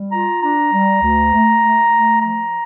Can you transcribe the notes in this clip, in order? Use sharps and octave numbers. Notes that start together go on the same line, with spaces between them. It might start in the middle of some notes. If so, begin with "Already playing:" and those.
Already playing: G3
F4 A#5
D4 A#5
G3
D2
A3
A3
A3
F3 A#5